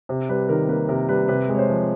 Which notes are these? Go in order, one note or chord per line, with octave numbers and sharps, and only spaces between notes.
C3
G3 B4
D#3 A#4
A#3 B4
C3 A#4
G3 B4
C3 B4
G#3 C#5
C5
F3